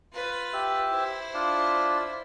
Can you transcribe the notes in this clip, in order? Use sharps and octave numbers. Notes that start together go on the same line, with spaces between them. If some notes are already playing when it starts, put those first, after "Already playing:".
F4 B4
G4 E5
E4 C5
D4 F4